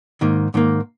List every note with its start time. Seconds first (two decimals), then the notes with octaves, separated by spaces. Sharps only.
0.21 G#2 D#3 A#3
0.54 G#2 D#3 A#3